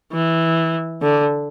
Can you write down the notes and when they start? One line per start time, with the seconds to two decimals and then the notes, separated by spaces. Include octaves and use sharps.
0.13 E3
1.02 D3